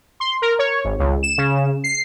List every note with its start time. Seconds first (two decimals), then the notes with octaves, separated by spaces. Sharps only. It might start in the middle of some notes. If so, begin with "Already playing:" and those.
0.20 C6
0.42 A#4
0.59 C#5
0.84 G#1
0.99 C#2
1.23 E7
1.38 C#3
1.84 C7